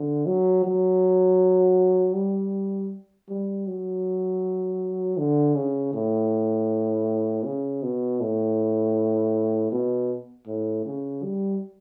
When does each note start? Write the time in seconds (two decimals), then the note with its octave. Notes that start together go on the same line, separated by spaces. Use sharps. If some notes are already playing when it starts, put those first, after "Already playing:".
Already playing: D3
0.26 F#3
0.64 F#3
2.15 G3
3.29 G3
3.67 F#3
5.18 D3
5.56 C#3
5.94 A2
7.45 C#3
7.83 B2
8.21 A2
9.72 B2
10.47 A2
10.86 C#3
11.24 G3